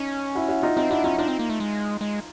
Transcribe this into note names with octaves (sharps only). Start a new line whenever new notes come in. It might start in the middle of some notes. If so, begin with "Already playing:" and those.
Already playing: C#4 D#4
E4 F#4
E4 F#4
D#4 F4
C4 D#4 F4
D4 E4 F#4
C#4 D#4 F4
D4 D#4 F4
C4
A#3
A3
G#3
G#3